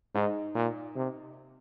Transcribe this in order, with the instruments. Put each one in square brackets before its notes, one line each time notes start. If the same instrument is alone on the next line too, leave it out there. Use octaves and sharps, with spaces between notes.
[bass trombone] G#2 [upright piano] D#4
[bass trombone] A#2
C3